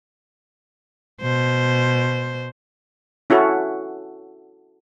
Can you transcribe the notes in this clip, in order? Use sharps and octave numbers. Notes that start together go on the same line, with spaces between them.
B2 C5
C#4 E4 F#4 A4